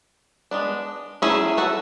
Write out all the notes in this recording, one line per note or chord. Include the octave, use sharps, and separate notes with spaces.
G#3 B3 D4
F#3 A3 C#4 E4 G#4
F#4 A4